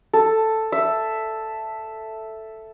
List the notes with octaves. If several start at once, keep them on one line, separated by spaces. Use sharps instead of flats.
A4
E5